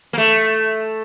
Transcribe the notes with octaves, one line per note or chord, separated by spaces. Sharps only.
A#3
A3